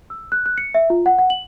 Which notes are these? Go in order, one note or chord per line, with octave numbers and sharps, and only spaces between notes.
E6
F#6
F#6
C#7
E5
F4
F#5
F#5
F#7